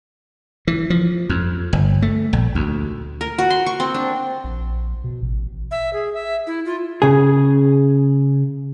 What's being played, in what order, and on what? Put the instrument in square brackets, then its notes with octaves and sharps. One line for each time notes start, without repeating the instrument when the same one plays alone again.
[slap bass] E3
F3
F2
G1
A3
A#1
D2
[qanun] A#4
F#4
C6
C#6
C4
D4
[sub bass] A#1
B2
A1
[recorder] E5
G#4
E5
E4
F4
[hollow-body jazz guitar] C#3 G#4